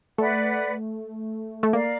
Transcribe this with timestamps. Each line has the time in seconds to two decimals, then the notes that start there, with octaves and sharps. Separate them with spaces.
0.18 A3 B4 D5 F#5
1.63 A3
1.72 A#3 A#4 D5 F5